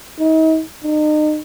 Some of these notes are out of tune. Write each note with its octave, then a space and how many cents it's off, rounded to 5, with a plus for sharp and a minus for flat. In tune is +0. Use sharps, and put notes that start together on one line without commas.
D#4 +40
D#4 -35